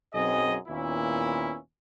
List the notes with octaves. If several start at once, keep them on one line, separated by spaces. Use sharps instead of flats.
B1 F#2 C4 G#4 D#5
D#2 A#2 B3 C#4 E4